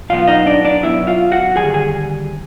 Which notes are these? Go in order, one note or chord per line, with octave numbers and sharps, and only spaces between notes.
B2 F#3 B3 F4 F5
D#4 D#5
D4 D5
D4 D5
B2 F#3 B3 E4 E5
F4 F5
F#4 F#5
D#2 D3 G3 G#4 G#5
G#4 G#5